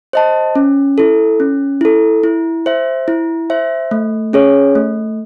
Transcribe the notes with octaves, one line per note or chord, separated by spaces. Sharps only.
C5 D#5 A5
C#4
E4 A4
C#4
E4 A4
E4
C5 E5
E4
C5 E5
A3
C#4 G#4 C#5
A3